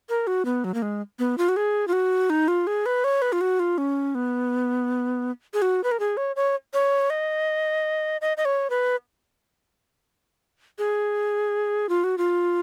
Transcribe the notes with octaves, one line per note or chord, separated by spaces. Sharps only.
A#4
F#4
B3
F#3
A#3
G#3
B3
F4
F#4
G#4
F4
F#4
D#4
F4
G#4
B4
C#5
B4
F4
F#4
F4
C#4
B3
G#4
F#4
B4
A#4
G#4
C#5
C#5
C#5
D#5
D#5
D#5
C#5
B4
G#4
F4
F#4
F4